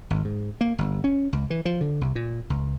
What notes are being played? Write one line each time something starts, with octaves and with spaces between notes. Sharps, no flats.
G#1
G#2
A#3
G1
C#4
C#2
E3
F3
D3
C2
A#2
C#2